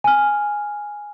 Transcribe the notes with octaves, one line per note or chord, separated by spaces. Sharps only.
G#5 F6